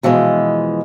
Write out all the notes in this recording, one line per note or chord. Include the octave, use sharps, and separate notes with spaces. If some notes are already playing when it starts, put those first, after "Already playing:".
B2 E3 F3 G#3 D#5